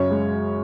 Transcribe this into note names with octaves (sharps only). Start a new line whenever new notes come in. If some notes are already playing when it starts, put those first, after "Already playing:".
Already playing: F#2 C#3 C#5
G#3